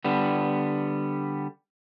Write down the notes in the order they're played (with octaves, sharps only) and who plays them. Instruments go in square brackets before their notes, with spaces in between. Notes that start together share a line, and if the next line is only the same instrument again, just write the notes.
[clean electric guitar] D3 G3 B3